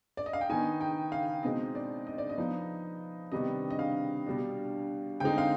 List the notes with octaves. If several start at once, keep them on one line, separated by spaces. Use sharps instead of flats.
D5
D#5
F5
G5
D#3 B3 D#4 G#5
G5
F5
B2 G#3 C4 D#4 D#5
D5
D#5
D5
D#5
F3 B3 D#4
C3 D#3 G3 B3 D4 D#5
D#5
F5
B2 G3 D4
D3 G#3 C4 D#4 G5
F5